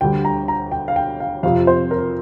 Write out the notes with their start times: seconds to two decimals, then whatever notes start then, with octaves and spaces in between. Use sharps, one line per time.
0.01 D2 D3 G3 G5
0.25 A#5
0.48 A#5
0.72 G5
0.88 F5
0.96 G5
1.20 F5
1.43 F2 C3 F3 F5
1.67 C5
1.91 A#4